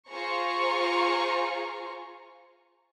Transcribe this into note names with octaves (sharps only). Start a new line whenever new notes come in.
F4 G#4 C5 A#5 C#6